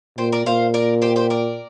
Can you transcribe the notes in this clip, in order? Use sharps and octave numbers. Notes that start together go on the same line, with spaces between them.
A#2 G4 C5
A#4 D5
A#2 C5 F5
A#4 D5
G4 C5
G4 C5
A#4 D5